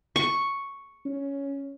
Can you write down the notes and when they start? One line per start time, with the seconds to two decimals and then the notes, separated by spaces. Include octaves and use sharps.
0.16 C#6
1.05 C#4